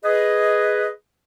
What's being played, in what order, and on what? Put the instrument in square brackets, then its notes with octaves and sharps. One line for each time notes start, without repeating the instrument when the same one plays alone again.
[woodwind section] G#4 B4 D#5